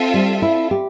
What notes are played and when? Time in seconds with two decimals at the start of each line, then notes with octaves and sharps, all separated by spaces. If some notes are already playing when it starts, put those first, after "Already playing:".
Already playing: C4 F4 A4 E5
0.14 G3
0.42 E4
0.71 G4